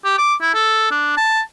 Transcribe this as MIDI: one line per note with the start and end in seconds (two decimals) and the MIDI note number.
0.05 0.18 67
0.18 0.35 86
0.42 0.51 64
0.54 0.90 69
0.91 1.17 62
1.17 1.41 81